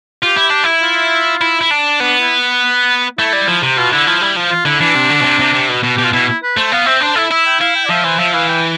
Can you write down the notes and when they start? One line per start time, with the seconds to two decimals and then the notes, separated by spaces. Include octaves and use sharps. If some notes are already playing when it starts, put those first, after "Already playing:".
0.23 F4 G4
0.37 E4
0.50 D4
0.64 E4
0.82 F4
1.41 E4
1.61 E4
1.71 D4
2.00 B3 D4
2.20 E4
3.18 A3 E4
3.33 G3
3.47 F3
3.62 C3
3.77 B2 F4
3.92 D3 E4
4.06 F3 E4
4.21 G3 E4
4.36 F3
4.51 F4
4.65 D3 E4
4.80 E3 D4
4.95 C3
5.10 D3
5.20 B2
5.24 C3
5.40 C3
5.54 C3
5.69 B2
5.83 B2
5.96 B2 G4
6.04 F4
6.13 B2 E4
6.28 E4
6.43 B4
6.57 A3 C5
6.72 B3 F5
6.86 C4 E5
7.01 D4 C5
7.16 E4 A4
7.31 E4 E5
7.46 G5
7.60 E4 F5
7.75 G5
7.85 D5
7.90 F3 E5
8.04 E3 C5
8.19 F3 E5
8.34 E3 F5
8.48 G5